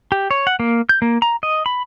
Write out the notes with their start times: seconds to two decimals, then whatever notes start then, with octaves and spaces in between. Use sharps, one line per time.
0.12 G4
0.31 C#5
0.47 F#5
0.60 A#3
0.89 G6
1.02 A#3
1.22 A#5
1.43 D#5
1.66 B5